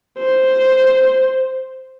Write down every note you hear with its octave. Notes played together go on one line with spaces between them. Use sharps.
C5